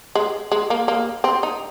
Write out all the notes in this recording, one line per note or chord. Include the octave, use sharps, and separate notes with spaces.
G#3
G#3
A#3
A#3
C4
D#4